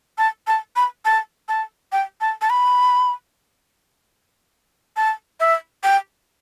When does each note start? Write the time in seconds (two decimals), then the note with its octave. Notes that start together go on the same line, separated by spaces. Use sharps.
0.18 A5
0.47 A5
0.76 B5
1.05 A5
1.48 A5
1.92 G5
2.21 A5
2.42 A5
2.50 B5
4.97 A5
5.40 E5
5.83 G5